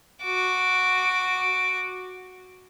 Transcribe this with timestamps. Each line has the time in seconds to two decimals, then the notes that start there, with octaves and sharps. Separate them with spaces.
0.23 F#4 D6